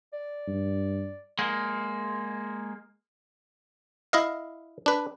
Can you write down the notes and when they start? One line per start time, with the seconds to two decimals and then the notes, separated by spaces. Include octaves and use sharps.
0.13 D5
0.48 G2
1.39 G#3 A#3
4.13 E4 D#5 F5
4.86 D4 B4